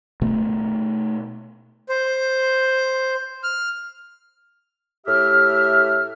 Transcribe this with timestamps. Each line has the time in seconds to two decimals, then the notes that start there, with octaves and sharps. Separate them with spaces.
0.22 B2 A3 B3
1.89 C5
3.43 F6
5.06 A2 G4 E5 F6